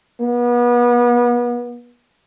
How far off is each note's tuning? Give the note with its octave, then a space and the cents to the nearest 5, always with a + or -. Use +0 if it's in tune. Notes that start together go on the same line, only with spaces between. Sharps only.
B3 -35